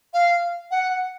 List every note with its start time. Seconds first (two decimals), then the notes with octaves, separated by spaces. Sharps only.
0.14 F5
0.71 F#5